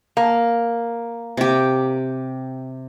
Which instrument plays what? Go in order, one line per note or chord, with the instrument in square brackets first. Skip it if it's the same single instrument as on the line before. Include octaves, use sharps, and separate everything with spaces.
[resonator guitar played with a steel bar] A#3
[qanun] C3 G4